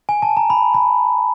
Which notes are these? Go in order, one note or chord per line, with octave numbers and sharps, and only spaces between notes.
G#5
A5
A#5
B5
B5